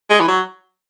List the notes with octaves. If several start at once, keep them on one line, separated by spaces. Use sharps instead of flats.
G#3
E3
F#3